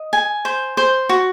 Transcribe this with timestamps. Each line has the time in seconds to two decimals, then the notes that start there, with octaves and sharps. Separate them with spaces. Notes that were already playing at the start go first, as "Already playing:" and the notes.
Already playing: D#5
0.13 G#5
0.45 C5
0.77 C5
1.09 F#4